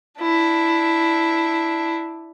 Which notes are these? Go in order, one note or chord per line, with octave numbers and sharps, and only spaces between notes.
D4 E4